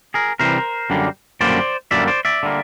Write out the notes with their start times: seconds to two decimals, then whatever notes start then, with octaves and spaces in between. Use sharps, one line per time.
0.14 G#4 A#4
0.39 C3 E3 G3 A#4 C5
0.90 F#2 D3 G3 A#3
1.41 F#2 D3 G3 A#3 C5 D5
1.91 F#2 D3 G3 A#3 D5 E5
2.08 C5 D5
2.25 D5 E5
2.43 D3 G3 A#3